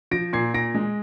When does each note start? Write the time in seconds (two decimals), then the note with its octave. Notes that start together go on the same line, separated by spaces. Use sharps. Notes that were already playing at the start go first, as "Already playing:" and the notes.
0.11 F3 A#6 D7
0.33 A#2 G#6 C7
0.54 A#2 A#6 D7
0.75 G#3